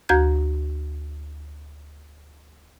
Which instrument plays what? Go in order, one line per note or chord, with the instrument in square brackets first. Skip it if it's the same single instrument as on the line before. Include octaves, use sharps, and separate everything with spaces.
[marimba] D2 F#4 A#5 G6 G#6